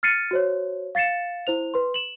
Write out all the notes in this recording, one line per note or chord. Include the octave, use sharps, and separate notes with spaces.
F6 A6 C7 C#7 D#7
F#4 C5 C#5
F5 A6 C7 C#7 E7
E4 C5 F7
B4 C6
E7 F#7